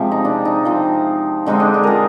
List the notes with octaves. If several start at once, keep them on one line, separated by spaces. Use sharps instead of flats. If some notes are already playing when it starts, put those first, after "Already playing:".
Already playing: C3 F3 G#3 C4
D#4
D4
D#4
F3 C4
D3 G#3 C4 D#4
D4
D#4
F4 G#4 A#4